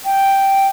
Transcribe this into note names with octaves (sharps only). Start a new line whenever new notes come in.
G5